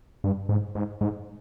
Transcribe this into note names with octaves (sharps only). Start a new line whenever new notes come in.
G2
G#2
G#2
G#2